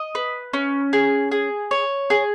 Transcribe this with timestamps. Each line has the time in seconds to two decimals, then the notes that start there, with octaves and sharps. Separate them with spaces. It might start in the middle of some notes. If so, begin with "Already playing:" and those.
Already playing: D#5
0.15 B4
0.53 C#4
0.93 G#4
1.31 G#4
1.71 C#5
2.10 G#4